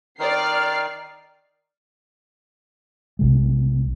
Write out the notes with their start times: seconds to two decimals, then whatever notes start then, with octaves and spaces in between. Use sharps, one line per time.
0.19 D#3 D#4 D5 F6 C7
3.19 B1 C3 G#3